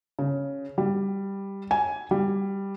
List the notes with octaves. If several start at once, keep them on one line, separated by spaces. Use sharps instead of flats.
C#3
G3
G#5
G3